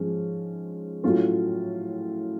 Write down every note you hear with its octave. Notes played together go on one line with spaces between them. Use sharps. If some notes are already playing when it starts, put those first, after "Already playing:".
Already playing: G#2 F3 G#3 C#4
A2 F#3 A3 C#4 F4